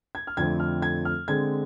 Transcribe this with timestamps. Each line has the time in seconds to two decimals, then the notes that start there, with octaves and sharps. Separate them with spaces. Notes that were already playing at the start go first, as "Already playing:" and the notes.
0.15 G#6
0.27 F6
0.37 F2 D3 A3 C4 G#6
0.60 F6
0.82 G#6
1.05 F6
1.28 D3 G#3 C4 G#6